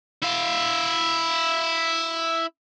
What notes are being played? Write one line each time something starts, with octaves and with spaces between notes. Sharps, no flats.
E4 F5